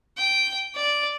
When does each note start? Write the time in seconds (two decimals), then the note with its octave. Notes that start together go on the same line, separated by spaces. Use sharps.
0.18 G5
0.75 D5